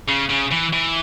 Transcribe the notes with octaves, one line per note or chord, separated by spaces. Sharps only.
C#3
C#3
E3
E3